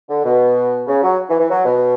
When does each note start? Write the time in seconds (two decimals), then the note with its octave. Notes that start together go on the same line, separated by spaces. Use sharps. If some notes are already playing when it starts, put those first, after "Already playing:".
0.10 D3
0.25 B2
0.87 C#3
1.03 F#3
1.29 E3
1.40 E3
1.50 F#3
1.65 B2